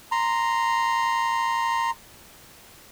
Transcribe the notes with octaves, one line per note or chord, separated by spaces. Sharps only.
A#5 C6